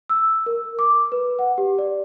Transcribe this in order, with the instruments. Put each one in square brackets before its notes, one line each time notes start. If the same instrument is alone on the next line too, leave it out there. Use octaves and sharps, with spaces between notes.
[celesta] E6
A#4
D6
B4
F#5
G4
D5